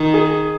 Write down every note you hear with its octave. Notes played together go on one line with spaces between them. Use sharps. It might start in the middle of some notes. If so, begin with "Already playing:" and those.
Already playing: D#3
G#4